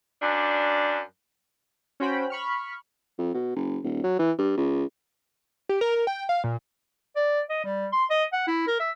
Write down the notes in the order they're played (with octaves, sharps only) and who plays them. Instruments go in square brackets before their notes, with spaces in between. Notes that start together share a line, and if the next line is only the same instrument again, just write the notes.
[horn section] F#2 D4
[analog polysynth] C#4 F#4 C5 G5 B5
B5 C#6 F6
[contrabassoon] F2
B2
F#1
D#1
F#3
E3
G2
C#2
[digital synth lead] G4
A#4
A#4
G5
F5
A#2
[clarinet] D5
D#5
G3
C6
D#5
F#5
E4
A#4
E5